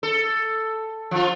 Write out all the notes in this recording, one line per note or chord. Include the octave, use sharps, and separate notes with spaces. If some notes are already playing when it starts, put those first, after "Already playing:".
A4
F3 F4